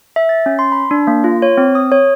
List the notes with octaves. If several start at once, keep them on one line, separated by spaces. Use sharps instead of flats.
E5
A6
C#4
C6
B5
D4
A#3
F4
C#5
C4
D#6
C#5